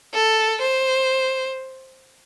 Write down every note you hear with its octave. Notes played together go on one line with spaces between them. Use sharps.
A4
C5